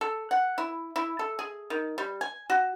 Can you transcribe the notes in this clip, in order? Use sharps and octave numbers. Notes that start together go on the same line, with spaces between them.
A4
F#5
E4
E4
A4
G#4
D#3
G3
G#5
F#4